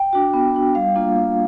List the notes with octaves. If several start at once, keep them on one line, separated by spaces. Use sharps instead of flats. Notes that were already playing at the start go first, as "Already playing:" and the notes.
Already playing: G5
D4 F#4
B3
D4 F#4
G3 F5
A#3 D4 F4
G3 F5